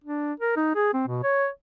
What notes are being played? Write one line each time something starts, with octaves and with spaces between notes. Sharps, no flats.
D4
A#4
D#4
G#4
C4
B2
C#5